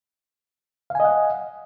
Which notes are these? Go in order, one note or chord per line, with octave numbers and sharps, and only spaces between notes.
D#5 F5 F#5 G#5